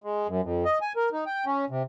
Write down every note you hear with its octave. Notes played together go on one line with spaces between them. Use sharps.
G#3
F#2
F2
D#5
G#5
A#4
D#4
G5
C#4
C3